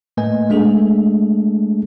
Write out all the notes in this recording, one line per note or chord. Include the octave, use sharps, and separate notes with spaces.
A2 A3 A#3 B4 D#5 G#5
G#3 A3 D4 G#4 A4